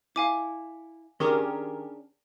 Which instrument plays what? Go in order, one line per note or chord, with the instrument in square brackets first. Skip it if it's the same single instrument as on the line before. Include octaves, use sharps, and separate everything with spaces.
[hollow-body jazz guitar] E4 [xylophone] F5 G#5 D6
[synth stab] D#3 G4 A#4 [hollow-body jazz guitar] C#4 D4 G#4